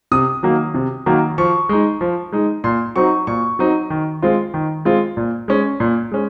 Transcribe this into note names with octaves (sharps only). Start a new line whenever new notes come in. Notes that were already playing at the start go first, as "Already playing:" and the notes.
C3 D#6
D#3 F#3 A#3
C3
D#3 F#3 A#3
F3 C#6
G#3 D#4
F3
G#3 D#4
A#2 C6
F#3 C4 D#4 C#6
A#2 C#6
F#3 C4 D#4
D#3
G#3 C4 F4
D#3
G#3 C4 F4
A#2
G#3 C#4
A#2
G#3 C#4